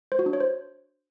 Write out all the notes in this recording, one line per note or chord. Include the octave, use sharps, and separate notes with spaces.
C5
F#4
D4
C#5
C5